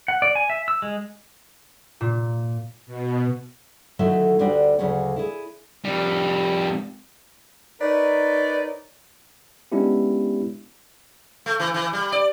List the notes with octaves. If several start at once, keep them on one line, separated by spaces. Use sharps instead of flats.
F#5
D5
G#5
E5
E6
G#3
A#2
B2
D3 D#3 F#3 A3 E4 E5
D2 D3 G3 D4 F#4 G4
D2 C#3 F#3 G#4 C#5 F#5
E4 G#4
F2 G3
D#4 A#4 B4 C#5 D5
G#3 B3 C#4 D4 E4 G4
A3
E3
E3
G3
D5